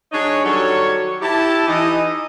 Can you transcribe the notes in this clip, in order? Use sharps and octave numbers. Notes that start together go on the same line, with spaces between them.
F#3 D4 D#4 G#4 C#5
D#3 F#3 G3 A4 C#5
E4 G4 A5
E3 D#4 D#5